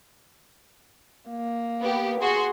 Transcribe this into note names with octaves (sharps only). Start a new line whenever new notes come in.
A#3
B3 G4
F#4 G#4 C6